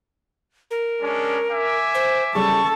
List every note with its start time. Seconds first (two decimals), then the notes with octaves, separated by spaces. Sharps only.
0.71 A#4
1.02 G#3 C#4 D4
1.51 E5 G#5 D6
1.95 C5
2.35 C#3 G3 A4 A5 C#6